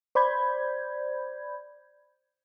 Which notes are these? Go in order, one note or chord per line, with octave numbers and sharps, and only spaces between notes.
C5 D5 B5 G6 G#6